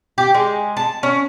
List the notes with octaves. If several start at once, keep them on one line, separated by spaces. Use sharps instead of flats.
G4
G#3
A5
C#4